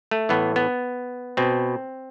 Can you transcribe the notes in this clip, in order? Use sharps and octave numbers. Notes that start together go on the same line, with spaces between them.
A3
A2 E3 B3
B3
B2 C4